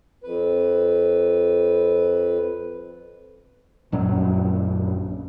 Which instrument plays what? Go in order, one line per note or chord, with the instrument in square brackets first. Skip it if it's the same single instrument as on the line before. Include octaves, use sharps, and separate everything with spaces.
[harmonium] F2 B4
[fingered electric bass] A#1 F#2 F#3